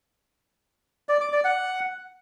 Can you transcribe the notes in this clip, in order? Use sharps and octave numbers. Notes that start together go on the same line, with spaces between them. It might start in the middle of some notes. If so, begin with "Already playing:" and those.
D5
D6
D5
F#5